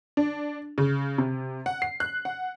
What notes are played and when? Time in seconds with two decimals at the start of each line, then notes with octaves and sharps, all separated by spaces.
0.17 D4
0.78 C#3
1.18 C3
1.66 F#5
1.82 C7
2.00 F#6
2.25 F#5